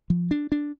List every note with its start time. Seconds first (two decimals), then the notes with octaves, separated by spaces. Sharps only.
0.10 F3
0.31 D4
0.52 D4